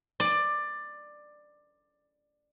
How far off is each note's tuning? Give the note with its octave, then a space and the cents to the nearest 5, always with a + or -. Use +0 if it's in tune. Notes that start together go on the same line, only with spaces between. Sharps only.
D5 +15